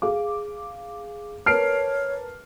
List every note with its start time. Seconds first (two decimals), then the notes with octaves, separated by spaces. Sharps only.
0.02 G#4 F5 D6
1.46 A#4 B4 C#5 A5 F6 C7 D7